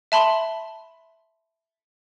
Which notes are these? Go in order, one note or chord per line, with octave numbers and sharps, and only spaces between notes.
E5 A5 B5 C6